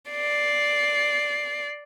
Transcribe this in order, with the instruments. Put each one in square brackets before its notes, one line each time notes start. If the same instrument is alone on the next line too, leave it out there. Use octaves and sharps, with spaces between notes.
[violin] D5 C7